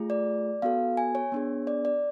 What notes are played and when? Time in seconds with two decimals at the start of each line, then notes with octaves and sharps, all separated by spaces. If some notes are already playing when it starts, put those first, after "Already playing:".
Already playing: A3 F4 G#4
0.10 D5
0.62 B3 F#4 A4 F5
0.97 G#5
1.15 C#5
1.32 B3 D4 G#4
1.67 D5
1.85 D5